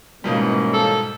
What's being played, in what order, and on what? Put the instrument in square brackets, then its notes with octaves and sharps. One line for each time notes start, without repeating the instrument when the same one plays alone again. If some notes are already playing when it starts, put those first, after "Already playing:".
[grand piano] G#2 B2 G3 [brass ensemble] E3 A#3 C#4
[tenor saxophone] A4